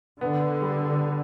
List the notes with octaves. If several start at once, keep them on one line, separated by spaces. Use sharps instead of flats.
D3 B3
G3